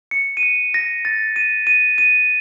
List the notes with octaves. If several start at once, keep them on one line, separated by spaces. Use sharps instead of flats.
C#7
D#7
C#7
A#6
A6
D#7
D#7
D#7